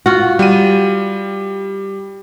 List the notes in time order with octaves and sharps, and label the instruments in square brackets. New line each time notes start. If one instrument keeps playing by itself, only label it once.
[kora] F4 F#4
[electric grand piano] G3 D#7